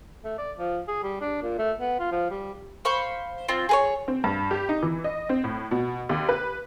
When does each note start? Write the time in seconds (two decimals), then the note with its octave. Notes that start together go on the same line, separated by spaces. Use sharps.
0.25 A3
0.38 D5
0.58 F3
0.88 G#4
1.03 G3
1.21 D4
1.43 A#2
1.59 A3
1.80 B3
2.00 F4
2.12 F3
2.31 G3
2.85 C5 F5 B5 C#6
3.48 C4 F4
3.69 G#4 B4 C#5
4.08 C4
4.24 G2
4.51 G4
4.69 D#4
4.83 E3
5.04 D#5
5.29 C4
5.44 A2
5.71 B2
6.09 D#2
6.29 B4